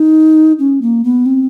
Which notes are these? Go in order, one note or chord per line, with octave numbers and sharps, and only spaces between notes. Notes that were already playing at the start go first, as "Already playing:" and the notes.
Already playing: D#4
C#4
A#3
B3
C4